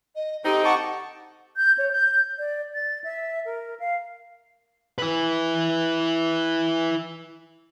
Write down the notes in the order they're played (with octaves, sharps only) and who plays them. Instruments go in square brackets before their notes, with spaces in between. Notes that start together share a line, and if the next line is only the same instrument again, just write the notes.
[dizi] D#5
[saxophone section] D3 C4 D#4 [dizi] G4
[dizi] F#5 [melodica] A5 C#6 D6
[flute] G6
C#5
G6
D5
A6
E5
A#4
F5
[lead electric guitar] E4 B4